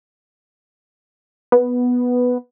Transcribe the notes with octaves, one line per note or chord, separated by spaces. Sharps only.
B3